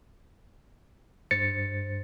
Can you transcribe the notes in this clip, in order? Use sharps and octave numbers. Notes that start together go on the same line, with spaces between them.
G2 C5 A6 C#7